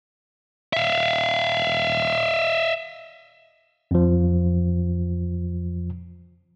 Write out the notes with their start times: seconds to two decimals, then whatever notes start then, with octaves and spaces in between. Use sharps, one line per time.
0.73 E5 F5
3.91 F2 F3